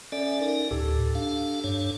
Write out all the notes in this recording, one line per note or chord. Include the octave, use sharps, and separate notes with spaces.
C#4 A4 D5 E5 D7
D#4 A#4
D2 A2 G4 A4
D4 F5
G2 D4 C#5